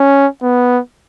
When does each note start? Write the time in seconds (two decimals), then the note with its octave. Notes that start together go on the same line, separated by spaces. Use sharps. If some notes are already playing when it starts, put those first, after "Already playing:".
Already playing: C#4
0.42 B3